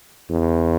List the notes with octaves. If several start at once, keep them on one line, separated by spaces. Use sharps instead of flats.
E2